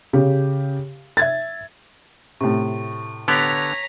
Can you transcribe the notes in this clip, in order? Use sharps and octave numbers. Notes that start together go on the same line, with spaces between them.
C#3 G4
E5 G#6 A6
A2 C3 C#6
D3 B3 G4 C#5 A#5 G#6 B6 F7